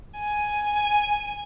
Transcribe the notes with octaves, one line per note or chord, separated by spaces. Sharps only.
G#5